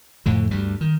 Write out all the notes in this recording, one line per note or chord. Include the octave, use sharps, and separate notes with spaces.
F2 A2 D3
D2 G2 G3
D#3